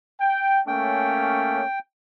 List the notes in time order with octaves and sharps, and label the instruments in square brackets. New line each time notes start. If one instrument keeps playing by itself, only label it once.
[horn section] G5
[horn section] A3 A#3 C#4 [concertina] G5